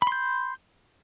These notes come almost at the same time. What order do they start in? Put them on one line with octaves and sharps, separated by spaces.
B5 C6 G6